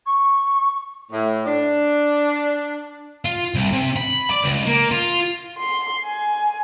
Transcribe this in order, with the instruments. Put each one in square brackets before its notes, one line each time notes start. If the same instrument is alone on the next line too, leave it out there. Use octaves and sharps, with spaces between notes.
[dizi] C#6
[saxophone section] A2
D4
[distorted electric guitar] F4
C2
C3
B5
D5
C#2
A#3
F4
[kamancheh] C6
G#5